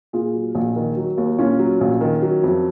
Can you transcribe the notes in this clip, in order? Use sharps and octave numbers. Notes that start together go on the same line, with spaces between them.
A#2 F4 G#4
F#3
A#1
D#3
F#3
D#2
A#2 C#4 F4
F#3
A#1
D#3
F#3
F2